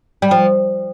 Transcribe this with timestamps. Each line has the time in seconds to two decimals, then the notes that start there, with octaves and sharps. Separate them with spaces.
0.22 G3
0.31 F3